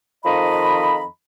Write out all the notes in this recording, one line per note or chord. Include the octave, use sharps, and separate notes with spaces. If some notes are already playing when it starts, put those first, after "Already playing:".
F2 D#3 F3 D#5 A#5 B5